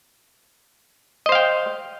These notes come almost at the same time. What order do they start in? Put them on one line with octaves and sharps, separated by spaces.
D#5 C5 F5 G5